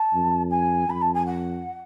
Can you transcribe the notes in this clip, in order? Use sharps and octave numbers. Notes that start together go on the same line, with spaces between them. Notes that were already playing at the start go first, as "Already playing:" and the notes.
Already playing: A5
F2
G#5
F2 B5
A5
G#5
F#5